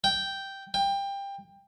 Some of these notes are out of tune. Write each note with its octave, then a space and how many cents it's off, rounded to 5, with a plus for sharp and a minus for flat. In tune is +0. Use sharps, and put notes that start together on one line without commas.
G5 -5
G5 +20